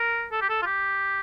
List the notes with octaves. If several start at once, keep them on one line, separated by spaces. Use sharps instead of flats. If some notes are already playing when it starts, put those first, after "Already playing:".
Already playing: A#4
A4
G4
A4
F4
G4